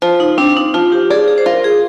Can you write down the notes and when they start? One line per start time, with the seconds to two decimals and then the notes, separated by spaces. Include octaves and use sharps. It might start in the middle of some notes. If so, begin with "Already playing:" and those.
0.02 F3 F4
0.20 D#4
0.38 C4 D4
0.56 D#4
0.74 F3 F4
0.92 G4
1.10 G#4 D5
1.28 G#4
1.38 C5
1.46 F4 A#4
1.64 G#4